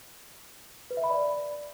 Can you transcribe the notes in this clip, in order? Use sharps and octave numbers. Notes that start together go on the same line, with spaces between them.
B4
E5
B5
D5